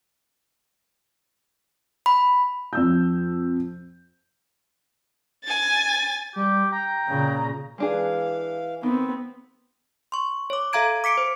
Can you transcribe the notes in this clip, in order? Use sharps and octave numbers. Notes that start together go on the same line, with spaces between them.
B5
F2 E6 G6
G#5 A6
G3 G4
G5 A#5
A#2 C#3
E3 G#3 D4 G#4 F5
D#3 B3 C4
C6 C#6
C#5 D6
A4 E5 F5 A#5 G#6 D7
D6 B6 C#7 D7
C5